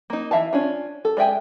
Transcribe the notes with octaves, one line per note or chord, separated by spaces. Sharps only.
A#3 D#4
E3 E5 F5 A5
C#4 D4 F4
A4
G#3 D5 E5 G5 G#5